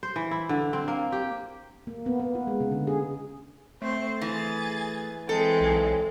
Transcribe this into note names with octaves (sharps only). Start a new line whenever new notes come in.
C5
E3
E4
D3
C4
A#3
G4
A#3
B3
B3
F4
G#3
C#3
D3
G#4
A3 C4 C5
E3 G#4 A6
E3 G#3 C4 A4
B1